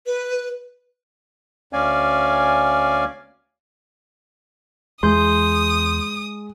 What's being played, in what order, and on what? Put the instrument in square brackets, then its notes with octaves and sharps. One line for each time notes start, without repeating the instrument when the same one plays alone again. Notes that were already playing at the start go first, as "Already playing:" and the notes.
[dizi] B4
[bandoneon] D2 C#4 D5 F5 G#5
[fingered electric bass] E2 [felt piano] G#3 [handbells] C6 G6 [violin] D#6